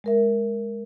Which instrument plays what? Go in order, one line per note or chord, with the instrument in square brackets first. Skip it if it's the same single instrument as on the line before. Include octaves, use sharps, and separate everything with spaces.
[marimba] G#3 A#4 E5